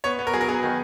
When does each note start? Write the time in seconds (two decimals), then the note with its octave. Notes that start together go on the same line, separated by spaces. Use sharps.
0.04 B3 C#5
0.19 B3
0.27 A#4
0.33 F#3 G#4
0.41 A#4
0.49 B3 G#4
0.63 D#3